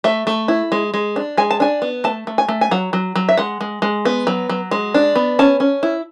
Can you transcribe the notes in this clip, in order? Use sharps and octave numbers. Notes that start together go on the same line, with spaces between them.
A3 E5
A3
E4
G#3
G#3
D4
G#3 G#5
A5
D4 G#5
B3
A3 A5
A3
G#5
A3
G#5
F#3 F#5
F#3
F#3
E5
G#3 F#5
G#3
G#3
B3
F#3
F#3
G#3
D4
B3
C#4 A5
C#4
E4